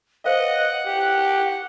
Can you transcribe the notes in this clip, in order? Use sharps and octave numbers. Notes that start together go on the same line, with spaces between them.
B4 C5 D#5 F5 F#5
G4